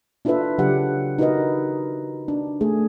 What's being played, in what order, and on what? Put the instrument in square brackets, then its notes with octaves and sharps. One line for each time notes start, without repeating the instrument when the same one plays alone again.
[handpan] D4 E4 F4 A4 B4 E5
C#3 F#3 D4 G4 F#5
D#4 E4 F#4 A#4 B4 D#5
D4
A3 G#4